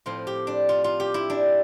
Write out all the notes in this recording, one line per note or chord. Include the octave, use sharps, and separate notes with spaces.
A2 F3 C4 F4
G4
D4
F4
F4
G4
E4
D4